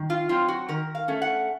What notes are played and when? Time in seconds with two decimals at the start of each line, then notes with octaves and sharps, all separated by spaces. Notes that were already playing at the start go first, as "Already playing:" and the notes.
Already playing: D#3
0.10 F4
0.29 F#3 C4 F4
0.48 F#4
0.69 D#3 A#4
0.95 F5
1.08 A3 C#4
1.22 F#5